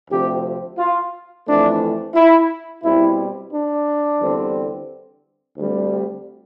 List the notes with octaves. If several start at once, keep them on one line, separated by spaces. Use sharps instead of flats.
D2 C3 F3 C4 G4
F4
F2 E3 A3 C4 D4
E4
B2 G3 C4 E4
D4
E2 D3 G3 C4
D2 D3 G3 C4